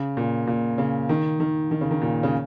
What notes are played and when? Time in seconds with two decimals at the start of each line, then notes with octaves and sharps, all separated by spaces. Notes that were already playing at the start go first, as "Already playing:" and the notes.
Already playing: C#3
0.17 A#2
0.47 A#2
0.78 C#3
1.09 D#3
1.40 D#3
1.71 D#3
1.81 C#3
1.91 D#3
2.02 A#2
2.23 C#3